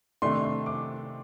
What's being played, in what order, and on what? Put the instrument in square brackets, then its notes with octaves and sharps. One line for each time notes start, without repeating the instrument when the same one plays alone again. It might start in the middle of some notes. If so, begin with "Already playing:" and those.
[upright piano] C3 D#3 A3 D4 C6
C6
D6